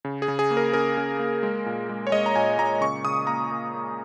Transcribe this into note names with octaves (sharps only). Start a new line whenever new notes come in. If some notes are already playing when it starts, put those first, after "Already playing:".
C#3
G#4
C#3
G#4
A#3
A#4
C#3 A#4
C#3
A#3
G#3
A#2
G#3
C#5
G#3 D#5
A#5
A#2 G#5
A#2 A#5
C#3 C#6
C#3 D#6
A#3 A#5
A#3
A#3